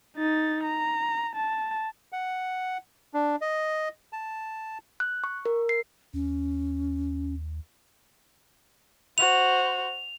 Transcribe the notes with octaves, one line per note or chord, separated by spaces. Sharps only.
D#4 A6
A#5
A5
F#5
D4
D#5
A5
F#6
C#6
A#4
C7
D#2 C#4
F#4 C5 F7